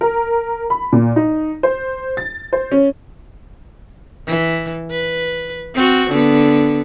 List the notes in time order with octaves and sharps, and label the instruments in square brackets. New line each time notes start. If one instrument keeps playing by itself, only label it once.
[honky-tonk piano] A#4
B5
A#2
D#4
C5
A6
C5
C#4
[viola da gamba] E3
B4
C4 F#4
D3 B3